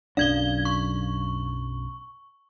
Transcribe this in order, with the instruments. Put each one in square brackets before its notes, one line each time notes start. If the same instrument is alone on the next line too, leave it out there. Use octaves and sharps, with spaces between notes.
[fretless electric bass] B1 F#2 D4 [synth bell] F5 G#6 G7
[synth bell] C#6